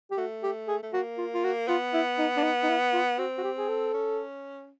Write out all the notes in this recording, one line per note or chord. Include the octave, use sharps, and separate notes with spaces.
G4
A3 F#4
G4
G#4
A3
A#3 F#4
F4
F4
F#4
B3 F4
E4
D#4
D4
D#4
D#4
E4
F4
C4 F#4
F#4
G4
G#4
A4
C#4